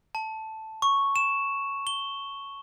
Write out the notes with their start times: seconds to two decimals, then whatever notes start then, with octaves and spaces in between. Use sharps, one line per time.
0.15 A5
0.82 C#6
1.16 E7
1.87 G7